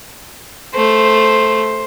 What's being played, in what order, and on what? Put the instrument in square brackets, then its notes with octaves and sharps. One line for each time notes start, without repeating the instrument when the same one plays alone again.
[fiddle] A3 [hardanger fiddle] C5